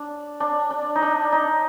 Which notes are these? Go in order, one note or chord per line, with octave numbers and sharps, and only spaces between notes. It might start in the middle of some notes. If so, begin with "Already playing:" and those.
Already playing: D4
D4
D4
D#4
D4
D#4